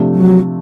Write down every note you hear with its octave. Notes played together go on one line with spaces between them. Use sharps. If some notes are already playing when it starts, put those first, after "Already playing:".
Already playing: C3 F3 A3 D4
F#3